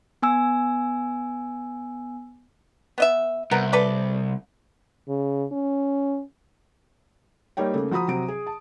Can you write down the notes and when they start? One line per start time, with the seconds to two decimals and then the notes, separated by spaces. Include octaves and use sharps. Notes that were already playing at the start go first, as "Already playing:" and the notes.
0.22 B3 G#5 E6
2.98 B3 D#5 E5
3.51 C2 B3 A#4
3.73 A4 B4 D5
5.08 C#3
5.52 C#4
7.57 G3 A#3 D#4 C#5 G5
7.74 C#3 A3 A#3
7.91 F3 F#4 A#5 B5 D#6
8.08 C3 F#3 C4 A#5 D7
8.28 G#4
8.47 A5